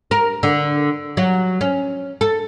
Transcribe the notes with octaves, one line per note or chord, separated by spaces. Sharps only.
A#4
D3
F#3
C#4
A4